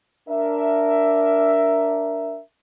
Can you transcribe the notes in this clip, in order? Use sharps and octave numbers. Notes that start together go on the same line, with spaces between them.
D4 A#4 E5